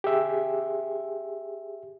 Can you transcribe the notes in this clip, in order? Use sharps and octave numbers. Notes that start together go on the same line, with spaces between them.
G4 G#4 E5